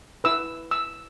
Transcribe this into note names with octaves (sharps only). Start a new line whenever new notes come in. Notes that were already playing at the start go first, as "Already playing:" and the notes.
E4 B4 E6
E6